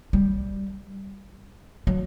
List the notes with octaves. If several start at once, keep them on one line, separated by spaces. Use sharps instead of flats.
G3
F#3